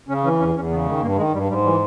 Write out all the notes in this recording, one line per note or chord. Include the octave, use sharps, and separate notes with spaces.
C#3 C#4
E3 C#4
E2 C#4
E2 C#4
C#3 B3
D#3 G#3
G2 A#3
D#3 G#3
G2 G3
G#2 G3
E3 G3